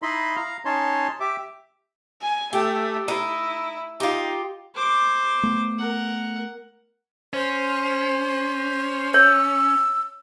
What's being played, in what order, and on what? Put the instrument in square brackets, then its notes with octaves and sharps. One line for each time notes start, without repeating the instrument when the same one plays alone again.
[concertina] D#4 E4 D#5 B5 C6
F5 A#5
C#4 D#4 C#5 A5 C6
G4 E5 D6
[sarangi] G#5
[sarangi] A3 [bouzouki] G4
[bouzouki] D#4 [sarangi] E4
[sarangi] D#4 [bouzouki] F4 G4
[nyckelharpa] C5 D6
[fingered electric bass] A3 B3
[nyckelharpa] A#4 F#5
[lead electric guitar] C#4 [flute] C5
[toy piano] C#5 [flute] E6